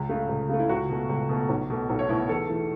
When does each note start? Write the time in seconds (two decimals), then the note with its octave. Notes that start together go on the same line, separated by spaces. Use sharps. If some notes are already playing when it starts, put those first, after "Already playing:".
Already playing: C#2
0.09 C#3 A3
0.29 C#2
0.49 C#3 A3
0.59 E4
0.69 C#2 F#4
0.89 B2 A3
1.09 C#2
1.29 B2 A3
1.49 B1
1.70 B2 A3
1.89 B1 A4
1.99 C#5
2.09 B2 A3 E4
2.29 E2 A4
2.49 E3 A3